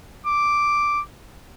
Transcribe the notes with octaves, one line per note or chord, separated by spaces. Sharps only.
D6